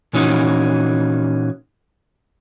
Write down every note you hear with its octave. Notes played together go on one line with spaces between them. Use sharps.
A#2 E3 C#4 D#4 F#4